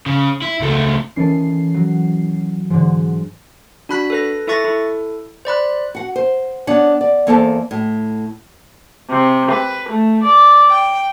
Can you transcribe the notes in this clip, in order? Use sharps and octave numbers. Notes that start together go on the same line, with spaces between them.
C#3
E4
C#2 A3
D#3 E3 B3 C#4 A4 C7
F#3
G#2 D3 E3
D4 F#4 B5 F#6 B6
A4 B4 A#6
E4 A4 E5 C#6 A6 A#6
E4 A4
C5 D5 B5 F#6
F#4 F#5
C5
B3 D4 C#5 F#5
D5
E2 A#3 A4 C5 G5 A5
A2
C3
B4
A3
D5
G5